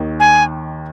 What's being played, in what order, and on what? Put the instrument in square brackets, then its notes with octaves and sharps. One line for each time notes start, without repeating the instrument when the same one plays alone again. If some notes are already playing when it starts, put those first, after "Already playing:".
Already playing: [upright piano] D#2 D#3
[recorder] G#5